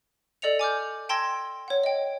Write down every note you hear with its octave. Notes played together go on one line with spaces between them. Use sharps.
A4 D5 D#5 C#7 F7
G#5 D6 F6 G6
G5 A5 C6 E6 G#6 A#6
C#5 F#5
D#5 G5